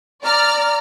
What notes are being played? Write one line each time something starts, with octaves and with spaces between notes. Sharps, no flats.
D5 A#5 F6